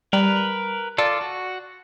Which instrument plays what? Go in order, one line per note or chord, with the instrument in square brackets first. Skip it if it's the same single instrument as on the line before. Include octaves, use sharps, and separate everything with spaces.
[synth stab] G3 [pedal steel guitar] A#4 B4
[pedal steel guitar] F4 A4 [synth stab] D5
[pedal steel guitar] F#4